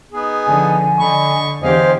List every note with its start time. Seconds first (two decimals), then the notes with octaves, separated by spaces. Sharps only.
0.12 B3 D#4 G#4
0.45 D3 F3 G#5
1.00 D3 D#5 B5 C#6
1.62 E2 D3 G4 C5 D#5 F5 G#5